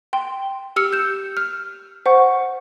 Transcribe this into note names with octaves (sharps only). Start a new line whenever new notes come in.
G5 C6
G4 E6 F6 C#7
G6 E7
F6
C5 F#5 C#6